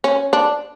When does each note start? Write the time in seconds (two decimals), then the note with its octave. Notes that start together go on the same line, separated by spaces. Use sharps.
0.04 C#4
0.33 D4